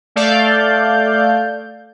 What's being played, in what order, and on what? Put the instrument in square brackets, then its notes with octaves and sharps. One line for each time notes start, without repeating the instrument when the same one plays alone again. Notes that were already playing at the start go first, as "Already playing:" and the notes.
[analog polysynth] A3 A4 D5 F5 G6